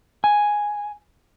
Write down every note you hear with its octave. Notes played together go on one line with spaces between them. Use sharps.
G#5